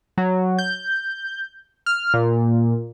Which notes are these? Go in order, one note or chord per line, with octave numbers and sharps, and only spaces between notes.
F#3
G6
F6
A#2